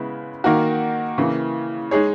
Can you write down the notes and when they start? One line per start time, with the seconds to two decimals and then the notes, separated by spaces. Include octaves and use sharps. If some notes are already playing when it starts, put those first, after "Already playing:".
Already playing: C#3 G#3 B3 E4
0.44 D#3 A#3 D#4 F#4 A#4
1.18 C#3 E3 A#3
1.91 G#3 D#4 G#4 C#5